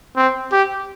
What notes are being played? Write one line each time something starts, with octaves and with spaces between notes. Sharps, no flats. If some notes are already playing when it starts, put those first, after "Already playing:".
C4
G4